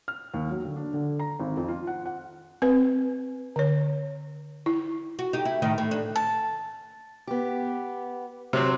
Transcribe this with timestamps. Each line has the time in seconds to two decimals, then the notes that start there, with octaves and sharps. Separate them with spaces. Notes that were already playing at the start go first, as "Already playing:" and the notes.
0.08 F6
0.34 D#2
0.51 F#3
0.65 D3
0.76 D4
0.94 D3
1.19 A#5
1.40 G#1
1.57 F2
1.68 F4
1.87 F#5
2.06 F#5
2.62 C4 B4
3.56 D3 C#5
4.66 E4
5.19 F#4
5.33 D#4 G4
5.45 E4
5.62 A2 D#3 D#4
5.78 A2
5.91 D4
6.16 A5
7.27 B3 G4
8.53 C3 F#3 C4 C5